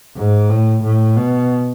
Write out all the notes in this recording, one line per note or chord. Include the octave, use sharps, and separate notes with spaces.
G#2
A2
A2
B2